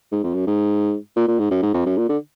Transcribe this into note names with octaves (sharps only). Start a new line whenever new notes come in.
G#2
F2
F#2
G#2
A#2
A#2
G#2
F#2
G#2
F2
F#2
A#2
D3